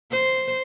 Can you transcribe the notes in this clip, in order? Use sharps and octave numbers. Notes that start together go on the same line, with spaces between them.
C5